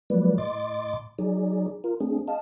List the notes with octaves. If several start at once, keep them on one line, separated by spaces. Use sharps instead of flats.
F3 F#3 G#3 A#3 B4 D5
A2 D#5 C6 D6 A6
F#3 D#4 G#4 D5
F4 A#4
A3 C4 D4 G#4
D#5 F5 A5